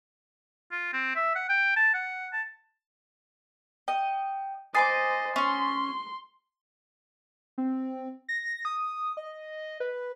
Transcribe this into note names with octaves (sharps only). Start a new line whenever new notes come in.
F4
C4
E5
F#5
G5
A5
F#5
A5
D#5 G5
C5 D#5 G#5 B5 D6 D#6 A6 C7
C#4 C6 C#6
C4
A#6
D#6
D#5
B4